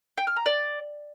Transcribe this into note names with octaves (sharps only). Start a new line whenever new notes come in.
G5
F6
A#5
D5